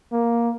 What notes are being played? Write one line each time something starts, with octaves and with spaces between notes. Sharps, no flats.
A#3